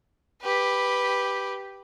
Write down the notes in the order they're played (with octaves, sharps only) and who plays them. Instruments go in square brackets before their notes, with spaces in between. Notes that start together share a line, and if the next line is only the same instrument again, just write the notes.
[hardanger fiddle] G4 B4